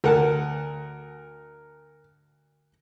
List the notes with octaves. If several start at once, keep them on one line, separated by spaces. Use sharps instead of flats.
D2 A#4 F#5 A5